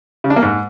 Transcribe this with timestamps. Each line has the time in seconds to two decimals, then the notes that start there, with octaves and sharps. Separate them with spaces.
0.24 C#3
0.30 D4
0.36 A#3
0.43 G#2